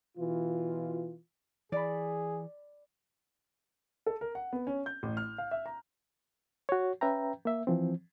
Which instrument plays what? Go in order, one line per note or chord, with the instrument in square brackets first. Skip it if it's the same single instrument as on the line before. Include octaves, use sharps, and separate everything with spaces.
[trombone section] B2 E3 F4
[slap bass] E3 [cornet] G#4 [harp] D5 B5
[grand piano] A4
A#4
F#5
B3
C#4
G6
A1
F6
F5
E5
A#5
[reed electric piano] F#4 C#5
C#4 B4 E5 G5 A#5
A#3 E5
E3 F3 C4